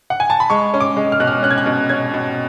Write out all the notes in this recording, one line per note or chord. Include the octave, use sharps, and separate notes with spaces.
F#5
G#5
A5
B5
G#3 C#6
C#4
D6
G#3
F6
B2 F#6
F6
C#4 F#6
G#6
F#6
B2
C#4 G#6
B2